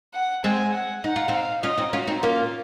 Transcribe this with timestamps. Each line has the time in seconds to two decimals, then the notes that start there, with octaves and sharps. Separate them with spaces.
0.14 F#5
0.44 G#3 C4 G#5
0.73 F#5
1.04 D#4 F#5
1.16 F4
1.28 C4 D#4 F5
1.63 C#4 F4 D#5
1.77 C4 D#4
1.93 C#4 F4 F#4
2.07 C4 D#4
2.22 A#3 C#4 F4